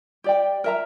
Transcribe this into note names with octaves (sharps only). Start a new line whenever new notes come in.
G4 D5 G5
A#4 E5 A#5